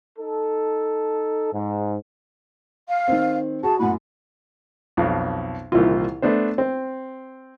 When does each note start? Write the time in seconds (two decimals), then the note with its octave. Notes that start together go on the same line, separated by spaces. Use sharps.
0.18 D#4 A4
1.52 G#2
2.89 F5
3.08 D#3 C4
3.63 F#4 G#4 A5
3.79 F#2 A2 F#5 B5
4.97 B1 F2
5.72 C2 A#2 D#3 E3 F4
6.22 A3 B3 D4 C5
6.58 C4